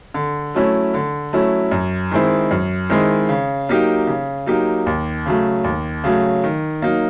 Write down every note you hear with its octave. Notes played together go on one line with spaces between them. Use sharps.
D3
F#3 A3 C#4 E4
D3
F#3 A3 C#4 E4
F#2
D#3 G#3 C4 E4
F#2
D#3 G#3 C4 E4
C#3
F#3 A#3 D#4 G4
C#3
F#3 A#3 D#4 G4
D#2
C#3 F#3 A3
D#2
C#3 F#3 A3
D#3
F#3 A#3 D#4